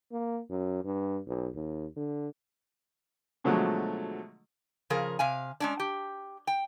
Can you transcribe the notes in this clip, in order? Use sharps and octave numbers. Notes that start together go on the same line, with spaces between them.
A#3
F#2
G2
B1
D#2
D3
B2 D3 F3 F#3 G#3 A3
C#3 F3 G#4 A#4
C3 F5 G#5
G#3 C#4 D4
G4
G5